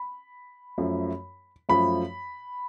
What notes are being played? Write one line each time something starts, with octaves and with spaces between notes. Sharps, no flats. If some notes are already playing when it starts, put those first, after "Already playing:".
Already playing: B5
F#2 F3 A3
F#2 F3 A3 B5